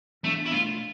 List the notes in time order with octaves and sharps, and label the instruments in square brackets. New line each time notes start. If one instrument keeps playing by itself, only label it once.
[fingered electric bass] E3 B3 D4 [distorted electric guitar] A3
[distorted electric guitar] E4
[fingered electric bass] B2 A3 D4 [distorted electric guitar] F4